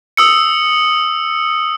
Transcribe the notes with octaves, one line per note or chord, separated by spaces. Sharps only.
D#6 E6 C#7